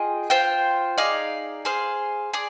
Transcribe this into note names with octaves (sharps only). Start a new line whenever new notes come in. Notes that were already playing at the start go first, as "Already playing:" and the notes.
Already playing: F4 G#4 D#5 G5
F4 C5 G5
D#4 G#4 D5 F5
G#4 C5 F5
G#4 D5